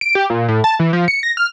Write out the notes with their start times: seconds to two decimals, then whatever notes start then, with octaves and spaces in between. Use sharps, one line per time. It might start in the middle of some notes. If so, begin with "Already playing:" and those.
0.01 D7
0.15 G4
0.30 A#2
0.48 A2
0.64 A5
0.79 E3
0.93 F3
1.08 C#7
1.23 A#6
1.37 F6